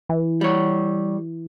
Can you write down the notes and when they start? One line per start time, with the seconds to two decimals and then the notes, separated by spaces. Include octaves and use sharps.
0.09 E3
0.41 G3 C#5